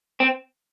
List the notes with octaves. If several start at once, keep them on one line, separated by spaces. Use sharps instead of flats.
C4